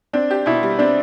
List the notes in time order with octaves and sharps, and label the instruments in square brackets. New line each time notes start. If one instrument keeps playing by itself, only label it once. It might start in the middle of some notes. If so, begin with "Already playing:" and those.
[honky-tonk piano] C4 [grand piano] D4
[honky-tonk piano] G4
[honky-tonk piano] B2 [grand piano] E4
[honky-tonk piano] G3
[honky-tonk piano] C4 [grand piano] D4